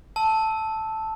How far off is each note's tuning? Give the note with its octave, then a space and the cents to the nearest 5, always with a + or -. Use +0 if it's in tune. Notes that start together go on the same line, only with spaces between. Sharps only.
A5 +0 E6 -15